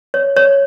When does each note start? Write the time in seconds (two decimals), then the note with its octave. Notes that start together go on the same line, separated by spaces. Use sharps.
0.14 C#5
0.36 C#5